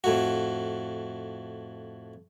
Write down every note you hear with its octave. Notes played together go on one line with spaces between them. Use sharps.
F2 A2 F#4